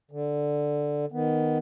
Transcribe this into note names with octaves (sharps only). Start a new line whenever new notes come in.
D3
D#3 B3